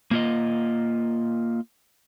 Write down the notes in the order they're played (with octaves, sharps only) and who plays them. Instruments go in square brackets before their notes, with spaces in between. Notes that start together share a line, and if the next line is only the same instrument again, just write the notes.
[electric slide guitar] A#3 F4 D#5